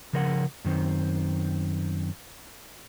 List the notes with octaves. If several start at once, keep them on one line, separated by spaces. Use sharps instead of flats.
C#3 F3 A#4 C#5 F#5
F#2 D#3 C4